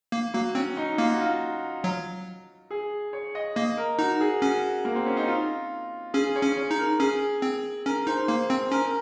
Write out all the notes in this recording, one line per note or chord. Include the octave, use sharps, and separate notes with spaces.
A#3
F#3 A#3
C4 C#4
D#4
A#3 F4
F#4
F4
F#3
G#4
C#5
D#5
A#3 D#5
A#4
D#4 F#4
G#4
C#4 F#4
A#3
C4
C#4
D#4
F4
C#4 G#4
C#5
C#4
C#5
D#4
A#4
C#4 G#4
C4
C#4 A#4
D#4 C5
A#3 C5
C4 C5
C#4 A#4
A#4